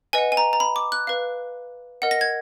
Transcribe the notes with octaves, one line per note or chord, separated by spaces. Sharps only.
B4 D#5 F#5 G#5
G#5
A#5
A#5
B5
D6
F#6
B4 F5
A#4 D#5 F#5
A#6
G#6